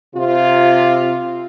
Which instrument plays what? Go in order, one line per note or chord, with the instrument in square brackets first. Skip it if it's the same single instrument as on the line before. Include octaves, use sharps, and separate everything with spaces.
[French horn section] C3 F4